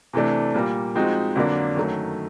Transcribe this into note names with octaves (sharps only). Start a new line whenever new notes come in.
C3 E3 A3 D4
A#2 G3 A#3
F3 G#3 C4 D#4 F#4
F2 D3 F#3 A#3 D4
F#2 D#3 F#3 A3